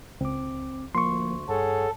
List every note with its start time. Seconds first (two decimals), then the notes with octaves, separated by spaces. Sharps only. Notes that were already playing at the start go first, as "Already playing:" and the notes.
0.21 C#2 C4 D6
0.95 D2 F3 A#3 C6 C#6
1.49 G2 G#4 A4 C#5 F#5